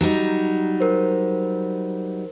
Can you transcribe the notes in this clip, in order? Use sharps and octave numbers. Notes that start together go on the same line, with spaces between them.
F#3 G3 D#4
A#4 C5